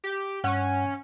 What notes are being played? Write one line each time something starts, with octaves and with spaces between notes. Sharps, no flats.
G4
G2 C#4 F#5 F#6